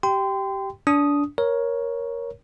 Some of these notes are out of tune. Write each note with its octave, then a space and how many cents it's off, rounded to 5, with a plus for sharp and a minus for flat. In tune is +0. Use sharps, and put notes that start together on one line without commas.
G4 -15 G5 +0 C6 -30
D4 -25 D#6 +0
A#4 +15 C#5 +0